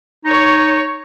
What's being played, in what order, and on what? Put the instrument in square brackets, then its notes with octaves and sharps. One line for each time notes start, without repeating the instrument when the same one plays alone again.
[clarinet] D#4 [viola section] C#5